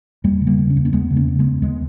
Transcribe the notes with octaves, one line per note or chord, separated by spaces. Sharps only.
E2 G3 A#3
C#3
G3 A#3
C#3
C#4
E2
A#3 C#4
E2 G#3 B3
C#3
A#3 C#4
C#3
G#3 B3
E2
D#2 G#3 B3